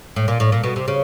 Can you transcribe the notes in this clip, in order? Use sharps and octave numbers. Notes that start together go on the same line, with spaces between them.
A2
A#2
A2
A#2
B2
C3
C#3